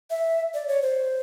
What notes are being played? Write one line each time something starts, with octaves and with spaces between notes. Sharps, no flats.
E5
D5
C#5
C5